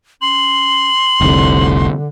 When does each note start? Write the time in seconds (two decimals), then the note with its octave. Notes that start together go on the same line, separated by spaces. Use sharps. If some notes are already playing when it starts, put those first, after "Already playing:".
0.21 C#4 C6 F#7
1.21 F1 C2 D3